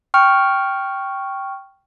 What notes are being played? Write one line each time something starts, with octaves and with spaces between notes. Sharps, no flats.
G5 C#6 F6